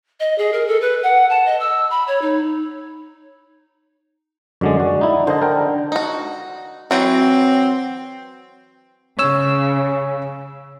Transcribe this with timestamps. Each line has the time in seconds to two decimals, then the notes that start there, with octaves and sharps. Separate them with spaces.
0.20 D#5
0.38 G#4
0.52 A#4
0.67 A4
0.81 B4
1.03 F#5
1.29 A5
1.46 D#5
1.60 E6
1.90 B5
2.07 C#5
2.21 D#4
4.61 F#2 D3 G#3 D5
4.80 F#4
5.01 D#4 E4
5.27 D3 C5 D#5
5.42 A#4 G5
5.92 D#4 F#4
6.91 E3 F#3 C4 F#4
9.19 C#3 C#5 E6